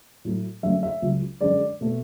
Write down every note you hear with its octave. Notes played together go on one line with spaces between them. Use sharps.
A2 F#3 A3
F#2 D3 F#3 A3 E5
E5
C#2 C#3 F#3
F#2 D3 G#3 D5
B2 A3